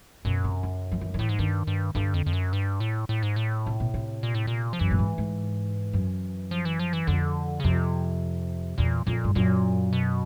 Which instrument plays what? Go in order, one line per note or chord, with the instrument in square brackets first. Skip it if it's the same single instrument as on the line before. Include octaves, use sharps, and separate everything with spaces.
[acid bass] F#2 [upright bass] B2
[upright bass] C3
C#3
F3
E3
D#3
[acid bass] A2 [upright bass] E3
[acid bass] G#2
[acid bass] G2 [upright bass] D#3
[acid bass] G2
[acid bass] G2 [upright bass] D3
[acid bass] F2
F2
F#2
G2
A2
A2
G#2
A2
[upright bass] C3
B2
C3
[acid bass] A#2
A2
A#2
F3
[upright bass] F#2 [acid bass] E3
[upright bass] A2
G#2
G#2
F#2
[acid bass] F3
E3
F3
E3
[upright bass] F2 [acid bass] D3
[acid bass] C#3
[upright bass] F2 [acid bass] C3
[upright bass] E2 [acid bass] A#2
[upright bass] F2 [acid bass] A#2
[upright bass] G2
[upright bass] F#2 [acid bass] A#2
[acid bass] B2